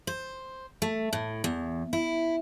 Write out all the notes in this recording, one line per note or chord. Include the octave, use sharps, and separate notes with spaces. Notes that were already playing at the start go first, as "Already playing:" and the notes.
C5
A3
A2
E2
E4